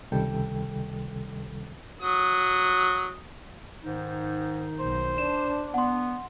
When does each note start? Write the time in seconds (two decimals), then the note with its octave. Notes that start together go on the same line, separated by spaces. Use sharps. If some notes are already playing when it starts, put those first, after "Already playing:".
0.12 C#2 C3 D#3 G3 A4 G5
2.01 F#3 D#6
3.84 G#2 D#3 D#4
4.79 B1 C5
5.18 D4 E7
5.74 B3 F#5 C6